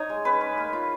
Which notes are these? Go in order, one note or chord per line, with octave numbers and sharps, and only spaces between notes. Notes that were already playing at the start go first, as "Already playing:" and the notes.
Already playing: D#4 C#5
G#3
C#4 B4
C#4
A#3
F4